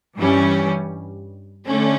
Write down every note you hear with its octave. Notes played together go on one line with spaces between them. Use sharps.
G2 E3 G3 C#4
D3 A3 C#4